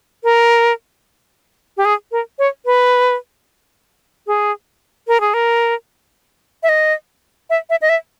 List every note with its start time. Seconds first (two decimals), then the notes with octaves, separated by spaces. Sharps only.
0.24 A#4
1.77 G4
1.85 G#4
2.12 A#4
2.39 C#5
2.66 B4
4.27 G#4
5.08 A#4
5.21 G#4
5.34 A#4
6.63 E5
6.69 D#5
7.50 E5
7.70 E5
7.82 D#5
7.89 E5